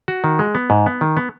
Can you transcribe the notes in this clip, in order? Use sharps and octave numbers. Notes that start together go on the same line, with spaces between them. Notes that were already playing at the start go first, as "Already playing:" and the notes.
F#4
D#3
G#3
B3
G#2
B3
D#3
B3